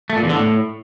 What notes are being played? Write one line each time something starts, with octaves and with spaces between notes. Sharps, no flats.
A3
A#2
E2
D3
A2